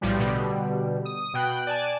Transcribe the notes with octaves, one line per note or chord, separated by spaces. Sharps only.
B1 A2 F3 G3
B2 D3 G3
D#6
B2 G5 F#6
D5 G#5 A5